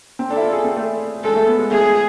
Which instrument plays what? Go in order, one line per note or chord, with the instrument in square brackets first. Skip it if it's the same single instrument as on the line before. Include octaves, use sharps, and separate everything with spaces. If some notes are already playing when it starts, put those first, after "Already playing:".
[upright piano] C4
[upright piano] D4 [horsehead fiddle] A4
[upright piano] E4
F4
G#4
C4
A3
[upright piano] G#3 [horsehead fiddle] A4
[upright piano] A3
B3
G#3
[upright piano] A3 [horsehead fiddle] G#4